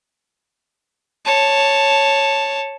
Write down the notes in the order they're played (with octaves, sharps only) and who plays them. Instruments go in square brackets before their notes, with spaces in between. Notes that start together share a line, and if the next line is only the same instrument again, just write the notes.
[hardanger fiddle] C#5 A5